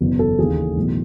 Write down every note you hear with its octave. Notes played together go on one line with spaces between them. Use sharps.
F#1 E2 B2
A4
D#2 C#3 E3 G#4
B1 A2 E3